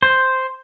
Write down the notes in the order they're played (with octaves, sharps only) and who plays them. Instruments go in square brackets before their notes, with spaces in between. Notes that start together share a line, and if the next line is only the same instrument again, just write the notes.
[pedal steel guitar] C5